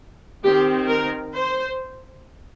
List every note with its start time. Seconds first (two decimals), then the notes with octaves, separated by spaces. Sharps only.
0.43 D#3 C4 G4
0.88 A#4
1.35 C5